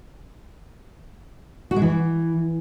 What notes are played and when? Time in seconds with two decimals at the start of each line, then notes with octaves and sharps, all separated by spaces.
1.71 F#4
1.76 G#3
1.82 E3